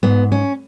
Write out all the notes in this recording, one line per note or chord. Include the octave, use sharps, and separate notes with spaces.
G#2 B3
C#4